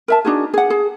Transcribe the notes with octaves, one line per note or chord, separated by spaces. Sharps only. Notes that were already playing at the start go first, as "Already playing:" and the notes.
A#4 E5 A5
D4 D#4 F#4 G#4
G#4 F#5
G#4